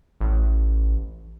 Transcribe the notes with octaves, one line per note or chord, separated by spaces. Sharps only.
A1